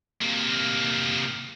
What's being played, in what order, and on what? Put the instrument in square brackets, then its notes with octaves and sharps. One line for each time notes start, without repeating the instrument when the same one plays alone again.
[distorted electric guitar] C3 A#3